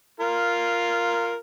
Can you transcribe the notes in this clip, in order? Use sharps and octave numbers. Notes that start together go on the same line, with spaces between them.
F4 A#4